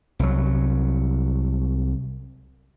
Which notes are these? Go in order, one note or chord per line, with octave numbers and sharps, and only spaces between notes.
C2 F#3